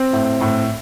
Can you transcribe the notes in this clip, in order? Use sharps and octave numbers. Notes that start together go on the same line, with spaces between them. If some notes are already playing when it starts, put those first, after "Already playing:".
Already playing: C4
A2
A2